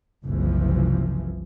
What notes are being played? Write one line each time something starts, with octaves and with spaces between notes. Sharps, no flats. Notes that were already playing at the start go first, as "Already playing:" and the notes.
F#1 C2 C3 E3 F3